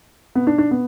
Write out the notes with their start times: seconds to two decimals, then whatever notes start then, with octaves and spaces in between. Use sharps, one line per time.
0.35 B3
0.47 D4
0.58 D4
0.71 B3